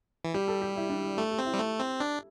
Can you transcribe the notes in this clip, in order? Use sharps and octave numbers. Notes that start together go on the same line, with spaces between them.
E3
G3 G4
A4
G4
E4
D4
E4
A3 A4
G4
C4
E4
G3
A3
C4
D4